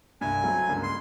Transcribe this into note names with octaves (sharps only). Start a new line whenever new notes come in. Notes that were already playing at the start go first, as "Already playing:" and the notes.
C2 G2 G#5
F#3 A3 C4
C#2 G2 A#3
C6